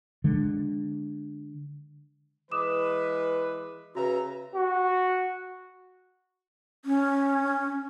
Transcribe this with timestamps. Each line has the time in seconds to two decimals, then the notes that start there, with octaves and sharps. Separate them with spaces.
0.24 D3 G#3
2.51 E3 G#3 B4 D6 D#6 E7
3.95 C#3 F#4 B4 E5 A#5
4.54 F#4
6.85 C#4